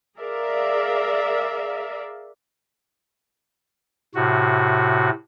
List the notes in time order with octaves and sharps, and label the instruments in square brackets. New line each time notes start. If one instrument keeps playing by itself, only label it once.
[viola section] G#4 A#4 D5 E5 F5
[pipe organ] A2 C3 F#4